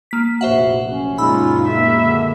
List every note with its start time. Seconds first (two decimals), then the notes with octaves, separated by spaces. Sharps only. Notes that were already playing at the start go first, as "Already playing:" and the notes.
0.11 A#3 B6
0.41 F1 A#1 F#4 C5 E5 F#5
0.88 F#1 C#4
1.18 F#1 A#2 G#3 D#4 F4 B5 E6
1.68 A#3 E5
2.01 D3